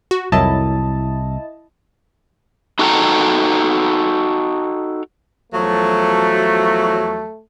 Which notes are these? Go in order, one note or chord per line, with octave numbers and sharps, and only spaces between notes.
F#4
C2 F2 D#3 F#3 E4 D#5 A5
D#4 F#4 A4 F#5 G5 A#5
E2 F3 F#3 A3